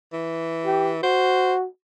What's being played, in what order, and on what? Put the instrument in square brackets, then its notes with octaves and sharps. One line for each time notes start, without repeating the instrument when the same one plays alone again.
[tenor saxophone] E3
[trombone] G4
[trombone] F#4 [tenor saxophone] C5